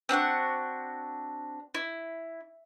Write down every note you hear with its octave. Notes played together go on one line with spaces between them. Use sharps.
C4 D4 F#4 F#5
E4